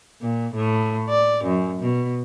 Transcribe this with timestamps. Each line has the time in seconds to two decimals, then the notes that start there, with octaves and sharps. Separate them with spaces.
0.22 A#2
0.55 A2
1.10 D5
1.45 F#2
1.81 B2